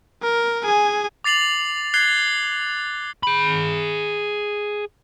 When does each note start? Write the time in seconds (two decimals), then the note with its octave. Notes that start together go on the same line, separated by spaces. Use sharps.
0.22 A#4
0.64 G#4 G#5
1.24 D6 A6 C7 F7 F#7
1.94 F#6 G#6 C7 G7
3.23 G#4 B5